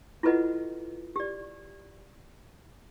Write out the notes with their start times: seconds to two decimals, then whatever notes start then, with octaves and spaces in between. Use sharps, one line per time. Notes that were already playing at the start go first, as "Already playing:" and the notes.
0.23 E4 F4 A4 B4 D#5 F#5
1.16 G4 D5